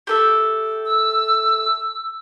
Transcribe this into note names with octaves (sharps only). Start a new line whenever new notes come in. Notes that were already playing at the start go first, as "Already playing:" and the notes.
G4 A4 E5
E6